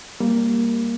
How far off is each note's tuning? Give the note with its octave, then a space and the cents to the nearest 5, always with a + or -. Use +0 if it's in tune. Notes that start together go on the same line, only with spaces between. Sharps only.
G3 +20 A#3 +0